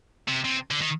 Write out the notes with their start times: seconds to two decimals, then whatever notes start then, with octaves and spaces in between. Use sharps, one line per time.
0.28 C3
0.44 C3
0.71 D3
0.81 D#3